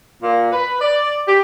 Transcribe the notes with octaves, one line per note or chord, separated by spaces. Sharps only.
A#2
B4
D5
G4